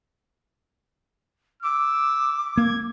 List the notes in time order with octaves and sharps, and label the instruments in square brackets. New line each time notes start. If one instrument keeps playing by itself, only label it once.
[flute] D6 [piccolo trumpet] E6
[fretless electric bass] A#3 [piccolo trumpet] G#6